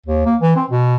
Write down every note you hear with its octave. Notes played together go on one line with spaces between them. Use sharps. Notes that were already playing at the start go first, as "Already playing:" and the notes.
D#2
A#3
E3
C4
B2